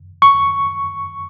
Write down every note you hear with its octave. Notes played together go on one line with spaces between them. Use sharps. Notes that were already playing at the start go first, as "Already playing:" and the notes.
C#6